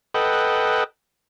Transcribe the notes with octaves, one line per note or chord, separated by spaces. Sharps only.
A4 B4 D#5 F#5 G5